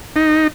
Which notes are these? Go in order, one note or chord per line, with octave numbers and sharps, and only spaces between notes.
D#4